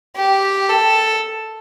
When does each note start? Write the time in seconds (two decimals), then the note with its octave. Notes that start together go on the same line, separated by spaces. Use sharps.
0.16 G4
0.69 A4